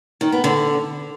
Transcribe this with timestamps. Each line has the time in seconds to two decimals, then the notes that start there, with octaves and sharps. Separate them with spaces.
0.21 D#3
0.32 B3
0.44 D3